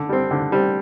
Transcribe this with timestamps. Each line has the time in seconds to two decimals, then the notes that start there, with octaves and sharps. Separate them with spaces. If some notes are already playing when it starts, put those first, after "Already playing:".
Already playing: D3
0.09 G3 C4
0.31 D3
0.52 G3 C4